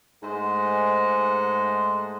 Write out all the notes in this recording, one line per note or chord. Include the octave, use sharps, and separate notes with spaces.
G#2 A3 G#4 C5 D#5 F#5